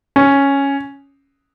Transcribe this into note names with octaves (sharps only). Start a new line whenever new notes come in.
C#4